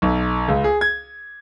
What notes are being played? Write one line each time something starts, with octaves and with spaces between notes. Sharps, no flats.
B1
C#2
G#4
G#6